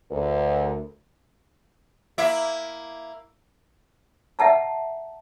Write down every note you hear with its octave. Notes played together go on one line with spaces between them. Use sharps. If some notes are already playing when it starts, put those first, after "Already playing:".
D2 A#4
A#3 E4 E5
E5 F#5 A5 A#5